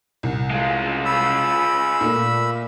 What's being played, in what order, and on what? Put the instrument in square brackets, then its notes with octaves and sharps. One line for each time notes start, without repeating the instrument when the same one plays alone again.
[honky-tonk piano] C2
[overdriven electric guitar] G#3 F4
[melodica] B5 E6
[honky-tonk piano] A#2 A3